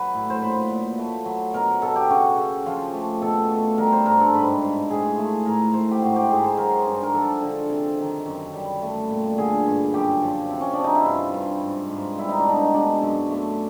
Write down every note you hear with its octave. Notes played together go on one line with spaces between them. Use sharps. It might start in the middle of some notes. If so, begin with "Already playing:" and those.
Already playing: F#3 B4
A2
C5
A#2 B4
A#2
A3
F#3
B2 A#4
B2 A4
G4
C#3 F#4
C#3
F3 F4
A3
B2 A4
A3
G3 A#4
C5
G2 A#4
A4
G#2 B4
G#2
A2 G#4
A3
A2 A#4
A2 C5
G4
G#2 F#4
G4
G#2 G#4
C5
F#3 A#4
G2
A#4
F3 A4
D3
C3
D#3
F#2
G3
A3
A#2
D3 G#4
G2
F#2 G4
F3
C3
C#4
D4
C3
D#4
E4
G2 F4
G2
G#2
G#2
G3 E4
D#4
D4
B2 D#4
G#3 D4
F#2
A3